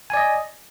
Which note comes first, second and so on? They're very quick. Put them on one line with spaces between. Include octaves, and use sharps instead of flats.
G#5 D5 D#5